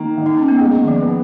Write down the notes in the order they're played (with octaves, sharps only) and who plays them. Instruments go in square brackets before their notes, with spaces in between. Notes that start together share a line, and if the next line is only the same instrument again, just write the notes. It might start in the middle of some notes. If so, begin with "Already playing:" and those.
Already playing: [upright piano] D#3 A#3
D#3
[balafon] D#4
C#4
B3
[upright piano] G#3 [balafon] A#3
[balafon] D#3
F3
[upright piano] B3